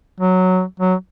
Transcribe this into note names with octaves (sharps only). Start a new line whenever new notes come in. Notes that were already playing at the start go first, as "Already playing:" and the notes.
F#3
F#3